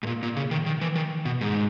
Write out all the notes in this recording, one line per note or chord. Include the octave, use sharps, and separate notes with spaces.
G#2
A#2
A#2
C#3
D#3
D#3
E3
D#3
B2
G#2